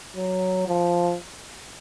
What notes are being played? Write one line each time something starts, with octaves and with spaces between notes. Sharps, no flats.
F#3
F3